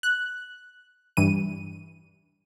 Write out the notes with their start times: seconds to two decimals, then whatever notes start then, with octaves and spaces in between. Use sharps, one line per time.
0.03 F#6
1.17 G2 E3 D#7